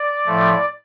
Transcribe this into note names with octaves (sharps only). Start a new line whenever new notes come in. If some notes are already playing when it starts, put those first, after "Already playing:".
Already playing: D5
A2 F3 A3